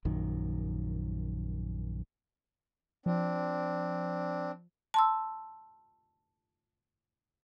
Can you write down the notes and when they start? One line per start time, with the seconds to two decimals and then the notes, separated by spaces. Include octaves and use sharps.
0.05 A#1 F#2 D#3
3.06 F3 C4 D4
4.94 A5 C6 E6